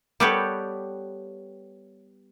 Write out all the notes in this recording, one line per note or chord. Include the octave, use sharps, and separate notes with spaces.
G3 B3 G4 A4 B4 C#5